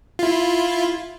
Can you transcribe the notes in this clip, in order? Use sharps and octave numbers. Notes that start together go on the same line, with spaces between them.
E4 F4